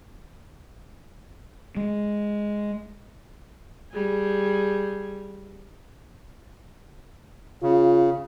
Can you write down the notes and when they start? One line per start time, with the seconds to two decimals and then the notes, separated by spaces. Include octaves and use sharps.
1.77 G#3
3.92 G3 G#4
7.63 C#3 F4